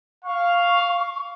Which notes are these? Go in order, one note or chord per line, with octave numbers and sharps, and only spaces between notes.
F5 C#6